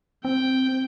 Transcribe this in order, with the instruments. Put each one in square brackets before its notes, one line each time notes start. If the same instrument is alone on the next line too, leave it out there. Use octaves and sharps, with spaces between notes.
[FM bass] C4 [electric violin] G5